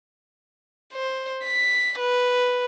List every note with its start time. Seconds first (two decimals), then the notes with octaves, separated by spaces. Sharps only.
0.94 C5
1.45 B6
1.99 B4